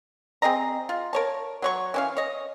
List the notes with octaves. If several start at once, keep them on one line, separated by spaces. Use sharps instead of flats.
C4 G#4 D#5 A#5
F4
A#4 C#5 A5
F#3 C#5 C#6
E3 C#4 F5
C#5 D#5